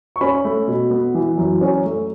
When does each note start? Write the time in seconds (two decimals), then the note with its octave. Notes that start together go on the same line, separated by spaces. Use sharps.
0.16 C#6
0.21 C#4 B5
0.45 A3
0.68 B2
0.91 B3
1.15 E3
1.38 F#2
1.61 C#4
1.85 A3